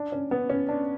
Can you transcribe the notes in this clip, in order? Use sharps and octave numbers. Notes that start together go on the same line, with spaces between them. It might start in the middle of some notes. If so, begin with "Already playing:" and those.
Already playing: D4
C#4
B3
C#4
D4